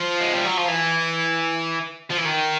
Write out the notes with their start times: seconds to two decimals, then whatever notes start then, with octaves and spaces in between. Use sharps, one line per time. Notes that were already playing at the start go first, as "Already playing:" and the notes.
Already playing: F3
0.20 G#3
0.33 G3
0.45 F#3
0.57 F3
0.68 E3
2.11 F3
2.18 E3
2.25 D#3